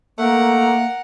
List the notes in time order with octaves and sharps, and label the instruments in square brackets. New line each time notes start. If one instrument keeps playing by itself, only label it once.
[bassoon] A3 [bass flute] A#3 [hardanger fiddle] A#4 F#5